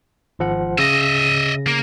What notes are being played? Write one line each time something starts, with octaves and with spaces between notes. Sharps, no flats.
G#1 F3 F#5
C#3 D#5 E5 A#6
A#3